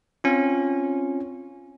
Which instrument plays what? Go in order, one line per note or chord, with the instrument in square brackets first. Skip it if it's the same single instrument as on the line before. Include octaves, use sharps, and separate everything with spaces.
[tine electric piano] C4 C#4 F4